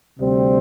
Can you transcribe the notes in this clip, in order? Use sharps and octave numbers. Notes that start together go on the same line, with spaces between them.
D2 C3 G3 C4